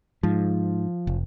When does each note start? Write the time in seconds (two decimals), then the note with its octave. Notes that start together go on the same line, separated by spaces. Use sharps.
0.23 G#2 F3
1.07 F1